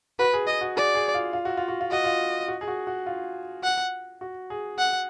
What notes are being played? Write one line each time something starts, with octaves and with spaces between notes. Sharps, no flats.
F#4 B4
G#4
G#4 D#5
F#4
G#4 D5
G#4
F4
F4
F#4
F4
F#4
F4
F#4 D#5
F4
F#4
G#4
F#4
F#4
F4
F#5
F#4
G#4
F#5